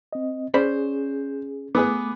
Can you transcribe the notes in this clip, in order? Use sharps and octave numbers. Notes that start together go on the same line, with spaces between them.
C4 D#5
C#4 G#4 C5 D5 B5
A3 B3 G#4 B4 D6